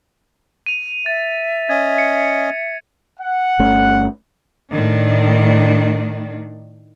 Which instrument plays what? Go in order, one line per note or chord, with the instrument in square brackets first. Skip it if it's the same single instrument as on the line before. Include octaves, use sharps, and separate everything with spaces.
[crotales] D#7 F7
[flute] E5 [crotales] A6
[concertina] C#4 D#5 [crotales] G#6
[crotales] C#7
[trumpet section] F#5
[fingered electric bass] G1 A3 C#4
[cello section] A2 D#3 D4